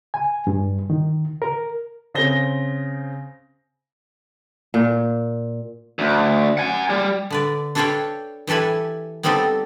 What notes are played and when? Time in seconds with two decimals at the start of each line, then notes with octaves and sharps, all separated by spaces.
0.14 G#5
0.47 G2
0.90 D#3
1.42 A#4
2.14 C#3 C4 A#6 G7
4.74 A#2
5.99 D2
6.58 F#5 G#5
6.90 G3
7.30 D3 B4 D5
7.75 D4 A4 B4 C#5 F5 G5
8.47 E3 G4 A4 B4 G#5
9.23 G3 B3 C4 D#4 G4 A4